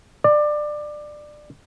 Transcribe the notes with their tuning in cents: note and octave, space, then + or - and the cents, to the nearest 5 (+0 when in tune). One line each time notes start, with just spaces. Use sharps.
D5 +20